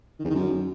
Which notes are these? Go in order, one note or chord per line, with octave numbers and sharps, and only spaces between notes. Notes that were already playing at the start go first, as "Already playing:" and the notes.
D#3
E2
D#3
F#2